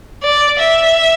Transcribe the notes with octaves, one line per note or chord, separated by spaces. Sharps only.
D5
E5